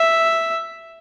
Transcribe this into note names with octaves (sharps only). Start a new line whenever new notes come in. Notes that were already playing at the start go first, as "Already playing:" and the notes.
Already playing: E5